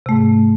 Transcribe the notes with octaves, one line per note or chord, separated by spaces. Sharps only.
G#2 C3 A3